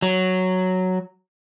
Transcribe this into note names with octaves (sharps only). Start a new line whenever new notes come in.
F#3